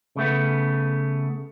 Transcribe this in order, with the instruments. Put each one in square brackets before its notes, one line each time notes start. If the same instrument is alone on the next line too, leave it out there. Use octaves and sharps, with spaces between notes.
[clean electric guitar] C#3 A3 B3